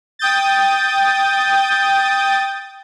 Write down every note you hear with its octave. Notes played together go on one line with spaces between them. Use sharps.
G5 D#6 G6 A6